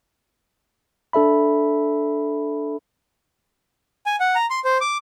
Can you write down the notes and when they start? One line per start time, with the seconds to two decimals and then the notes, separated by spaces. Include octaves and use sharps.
1.13 D4 A4 E5 B5
4.06 G#5
4.20 F#5
4.35 A#5
4.50 C6
4.65 C5
4.81 D6